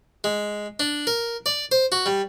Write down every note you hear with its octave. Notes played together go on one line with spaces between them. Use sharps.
G#3
D4
A#4
D5
C5
F#4
G3